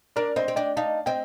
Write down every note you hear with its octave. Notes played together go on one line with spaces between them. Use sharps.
D4 A#4 D5
C4 C5 D#5
C4
D4 D#5 G5
D#4 F5 A5
C4 D#5 G5